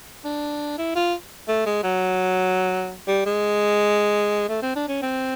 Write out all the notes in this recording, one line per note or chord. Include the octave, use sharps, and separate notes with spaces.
D4
E4
F4
A3
G#3
F#3
G3
G#3
A3
C4
D4
C#4
C4